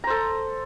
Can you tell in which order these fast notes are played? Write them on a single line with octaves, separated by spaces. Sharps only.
A#5 C5 A4